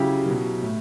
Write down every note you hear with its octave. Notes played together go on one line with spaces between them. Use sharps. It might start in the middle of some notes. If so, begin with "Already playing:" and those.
Already playing: C#3 F#3 E4 G4
B2 F#3
A2